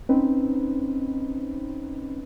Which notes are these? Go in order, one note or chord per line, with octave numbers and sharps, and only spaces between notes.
C4 C#4 D#4 B4